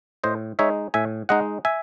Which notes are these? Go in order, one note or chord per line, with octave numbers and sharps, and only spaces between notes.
A2 C5 D#5
G#3 D#4 C#5 E5
A2 E5 G#5
G#3 D#4 D#5 F#5
E5 G#5